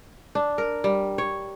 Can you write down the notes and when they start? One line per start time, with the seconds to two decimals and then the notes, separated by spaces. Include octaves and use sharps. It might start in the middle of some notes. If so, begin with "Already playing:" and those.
0.35 D4
0.58 A#4
0.84 G3
1.18 C#5